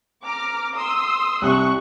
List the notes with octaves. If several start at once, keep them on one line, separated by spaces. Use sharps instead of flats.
A#5 D6 F6
C6 D#6 E6
C2 C3 C#6 F#6